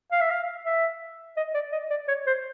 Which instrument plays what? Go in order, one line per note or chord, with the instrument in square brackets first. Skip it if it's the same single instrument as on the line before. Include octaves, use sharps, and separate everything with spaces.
[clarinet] F5
E5
F5
E5
D#5
D5
D#5
D5
C#5
C5